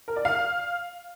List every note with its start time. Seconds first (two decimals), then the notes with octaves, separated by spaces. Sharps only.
0.08 A#4
0.16 D5
0.25 F5